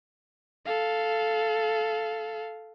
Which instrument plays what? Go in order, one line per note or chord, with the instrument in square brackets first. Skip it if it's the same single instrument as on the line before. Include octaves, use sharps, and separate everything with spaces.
[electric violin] A4 F5